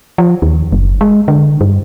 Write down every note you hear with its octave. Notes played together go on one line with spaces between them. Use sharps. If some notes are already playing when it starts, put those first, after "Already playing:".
F3
D#2
F#1
G#3
D3
G2